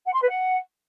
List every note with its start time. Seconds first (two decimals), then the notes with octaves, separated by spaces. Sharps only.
0.05 F#5
0.14 C6
0.22 B4
0.30 F#5